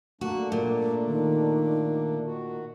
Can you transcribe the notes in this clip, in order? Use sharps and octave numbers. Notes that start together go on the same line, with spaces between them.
A3 A#3 D4 F#4
A#2
D#3
D#3 F#4